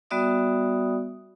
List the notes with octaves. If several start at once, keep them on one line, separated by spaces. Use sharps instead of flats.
G3 B3 F#4 D5 E5 D#6